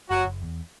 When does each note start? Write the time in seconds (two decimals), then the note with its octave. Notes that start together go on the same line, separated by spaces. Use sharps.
0.09 F#1 F#3 F#4
0.25 F#1
0.42 E2